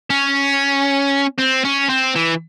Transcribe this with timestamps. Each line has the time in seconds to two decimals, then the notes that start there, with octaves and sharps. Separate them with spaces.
0.10 C#4
1.38 C4
1.64 C#4
1.89 C4
2.15 E3